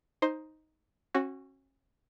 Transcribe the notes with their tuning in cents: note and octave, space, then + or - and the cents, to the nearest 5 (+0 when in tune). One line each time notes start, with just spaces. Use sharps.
D#4 +5 C5 +10
C#4 -35 F#4 +0